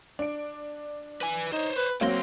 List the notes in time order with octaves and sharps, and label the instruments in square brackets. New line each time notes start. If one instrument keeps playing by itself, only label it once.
[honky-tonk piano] D4 D7
[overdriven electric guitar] B4 G#5
[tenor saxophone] D#4 [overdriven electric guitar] C5 C#5
[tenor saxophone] B4
[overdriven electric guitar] C#2 C6 [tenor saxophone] F#3 [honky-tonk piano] A#3 C4 A#6